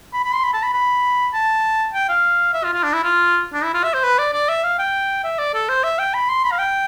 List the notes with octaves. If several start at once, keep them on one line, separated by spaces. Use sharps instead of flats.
B5
B5
C6
B5
A5
B5
B5
A5
G5
F5
E5
F4
F4
D4
E4
F4
D4
E4
F4
E5
C5
B4
D5
D5
E5
F5
G5
E5
D5
A4
C5
E5
G5
B5
C6
B5
F5
G5